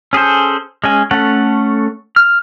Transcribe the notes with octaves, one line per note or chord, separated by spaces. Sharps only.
C#4 G#4 A4 C5
G#3 C#4 G#5
A3 C#4 A4 F#5
F6